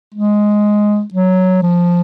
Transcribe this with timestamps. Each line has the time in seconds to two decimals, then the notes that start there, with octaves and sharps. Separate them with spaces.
0.14 G#3
1.14 F#3
1.63 F3